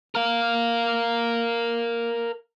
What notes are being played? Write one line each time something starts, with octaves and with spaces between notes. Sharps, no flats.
A#4 F5